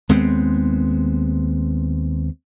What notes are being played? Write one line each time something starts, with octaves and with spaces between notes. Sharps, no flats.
D#2 G#3 B3 C4